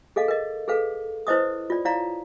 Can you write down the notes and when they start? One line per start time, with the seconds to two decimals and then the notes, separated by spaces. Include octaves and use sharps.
0.16 G#4 A4 D#5 F5
0.28 A#4 D#5
0.68 G#4 A4 B4 F5
1.27 E4 B4 C5 D#5 D6 D#6
1.70 F4 D5
1.85 E4 C#5 D5 F5 A#5